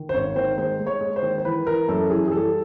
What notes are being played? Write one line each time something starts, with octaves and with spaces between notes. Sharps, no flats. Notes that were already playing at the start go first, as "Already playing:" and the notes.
Already playing: D#3
C5
G#1 C#5
D#3 C5
G#3 C5
G#3
C#5
G#3
C5
D#3
C5
E3 B4
E3 A#4
F#2 A4
E3 G#4
G#4
G3 A4